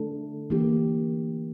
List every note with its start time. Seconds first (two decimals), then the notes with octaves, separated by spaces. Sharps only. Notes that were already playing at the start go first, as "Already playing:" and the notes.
Already playing: D3 A3 D4 A4
0.50 E3 A#3 D4 G4